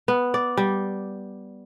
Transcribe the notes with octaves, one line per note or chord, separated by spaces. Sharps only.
B3
D5
G3